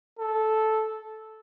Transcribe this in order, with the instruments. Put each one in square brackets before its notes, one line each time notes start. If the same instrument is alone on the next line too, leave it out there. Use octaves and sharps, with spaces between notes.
[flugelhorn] A4